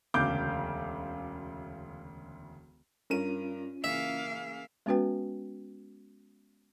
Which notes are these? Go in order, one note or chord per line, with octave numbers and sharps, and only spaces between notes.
E1 D2 C#3 F5 D6 G6
G2 C#4 F4 A#4 D#7
C#3 E3 A#3 E5 F5
G#3 B3 C#4 F#4 B4 G5